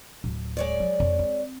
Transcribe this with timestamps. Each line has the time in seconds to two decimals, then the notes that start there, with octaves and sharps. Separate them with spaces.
0.24 D1
0.57 G#3 C#5 D5
0.80 F#3
1.00 F2
1.19 C4